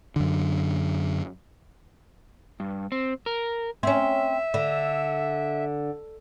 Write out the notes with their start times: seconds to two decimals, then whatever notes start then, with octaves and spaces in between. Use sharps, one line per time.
0.16 F#2 D3
2.60 G2
2.92 C4
3.26 A#4
3.83 C4 C#4 E5
4.54 D3